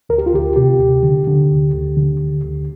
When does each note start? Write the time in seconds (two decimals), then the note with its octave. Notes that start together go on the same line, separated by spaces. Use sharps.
0.09 D2 A#4
0.18 G4
0.26 F4
0.33 D2 G4
0.56 C3 G4
0.80 D2
1.03 D3
1.27 D3
1.51 D2
1.73 D2
1.97 D3
2.21 D2
2.45 D2